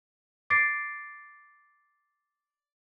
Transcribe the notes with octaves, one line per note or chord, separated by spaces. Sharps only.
D6 A6 C7 D7